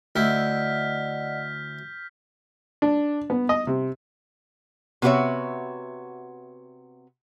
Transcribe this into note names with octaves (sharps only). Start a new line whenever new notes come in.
D2 E4 D5 D#5 F#5 F6 G6 B6
D4
B3
D#5
C3
C3 B3 F#4 G4 C#5 E5